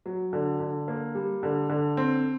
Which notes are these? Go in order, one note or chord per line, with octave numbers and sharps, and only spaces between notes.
F#3
D3
D3
A#3
G3
D3
D3
C4